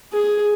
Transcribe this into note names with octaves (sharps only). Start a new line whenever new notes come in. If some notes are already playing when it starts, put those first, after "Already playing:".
G#4